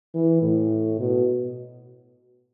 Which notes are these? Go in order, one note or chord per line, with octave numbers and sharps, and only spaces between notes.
E3
A2
B2